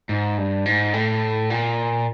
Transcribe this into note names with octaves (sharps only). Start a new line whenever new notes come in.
G#2
G2
G#2
A2
A#2